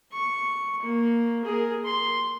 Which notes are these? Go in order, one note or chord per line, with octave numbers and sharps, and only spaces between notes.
C#6
A#3
G#4 A#4
C6